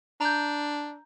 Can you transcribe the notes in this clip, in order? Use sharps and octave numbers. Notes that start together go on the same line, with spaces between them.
D4 A#5 G6